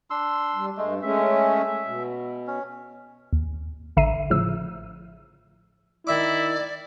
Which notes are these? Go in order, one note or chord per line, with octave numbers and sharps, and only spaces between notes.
D4 C6 E6
G3
G2 G#3 A3
G#3 A3 C#4 E5
B2
C#4
D#2
A1 D3 E5 A#5 C7 D#7
A2 C#3 F3 E6
D#3 E4 D5 E5 D6